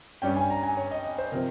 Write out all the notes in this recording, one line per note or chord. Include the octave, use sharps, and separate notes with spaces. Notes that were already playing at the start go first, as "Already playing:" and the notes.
G2 G3 C#4 G5
G#5
A#5
G#5
C#5
D#5
D#5
C5
C3 F3 C4 A#4